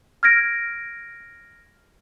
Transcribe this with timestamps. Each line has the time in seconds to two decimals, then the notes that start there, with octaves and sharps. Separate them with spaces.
0.23 F6 G#6 A#6 D7